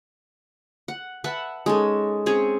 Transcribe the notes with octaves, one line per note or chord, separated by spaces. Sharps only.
F#5
B4 E5 F#5 A5
G#3 C#4 D#4 A4
C4 C#4 G#4 C#5